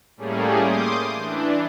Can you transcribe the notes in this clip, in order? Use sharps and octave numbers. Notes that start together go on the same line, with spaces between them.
A2 G3 A3 A#3 C#4 G#4
C6 D6 D#6 G6
E3 D4